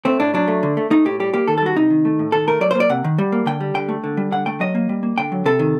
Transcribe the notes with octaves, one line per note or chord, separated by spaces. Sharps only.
A3 C4
A2 D4
F#3 D4
A3
D3
A3
A3 D#4
A2 G4
G3 G4
A#3 G4
D#3 A4
A4
G3 F#4
C3 D#4
D#3
A3
A2
D#3 A4
A3 A#4
F#3 D5
C5
A#3
D5
C3 F#5
D#3
G3
A#3
D3 G5
G3
D3 G5
A3
D3
G3
D3 F#5
A3 G5
F#3 D#5
A#3
G3
A#3
D3 G5
F#3
C3 A4
D#3